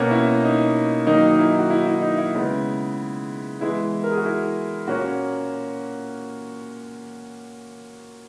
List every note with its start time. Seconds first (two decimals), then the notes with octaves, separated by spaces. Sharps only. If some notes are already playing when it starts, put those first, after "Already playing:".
Already playing: B2 A#3 C#4
0.11 E4
0.44 D#4
1.07 D#3 F#3 A#3 D#4
1.28 D#4
1.39 E4
1.59 F#4
1.70 E4
1.86 E4
2.02 D#4
2.18 E4
2.35 C#3 G#3 B3
3.60 E3 G#3 B3 E4
4.04 A#4
4.10 G#4
4.17 F#4
4.25 E4
4.88 A#2 A#3 C#4 F#4